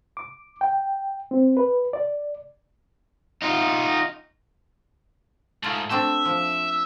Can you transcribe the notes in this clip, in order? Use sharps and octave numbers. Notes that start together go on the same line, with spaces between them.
D6
G5
C4
B4
D5
D#4 F4
G#2 A3 F4
A3 C4 D4 E5
F3